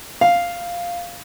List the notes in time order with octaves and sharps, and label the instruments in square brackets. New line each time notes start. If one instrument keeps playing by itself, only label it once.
[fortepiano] F5